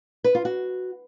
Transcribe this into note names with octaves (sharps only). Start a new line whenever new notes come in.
B4
F4
F#4